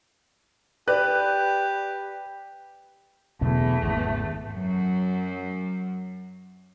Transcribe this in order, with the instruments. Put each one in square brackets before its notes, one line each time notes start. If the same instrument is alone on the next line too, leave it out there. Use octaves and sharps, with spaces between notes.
[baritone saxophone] G4 [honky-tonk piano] B4 D5 F#6
[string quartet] E2 A3 [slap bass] B2 D3 F#3
[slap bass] G#1 C#3
[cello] F#2 F#3